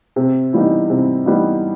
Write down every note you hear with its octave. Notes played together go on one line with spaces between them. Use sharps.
C3
E3 G3 B3 D#4
C3
E3 G3 B3 D#4